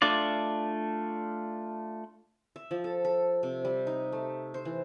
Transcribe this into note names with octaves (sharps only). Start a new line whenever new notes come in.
A3 D4 F4 D5
E5
F3
A4
A4
C3
G3
D#4
A3
C5
E3